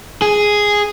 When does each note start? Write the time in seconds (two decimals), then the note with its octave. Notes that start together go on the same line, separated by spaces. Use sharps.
0.22 G#4